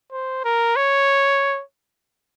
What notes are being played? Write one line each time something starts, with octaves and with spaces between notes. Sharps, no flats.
C5
A#4
C#5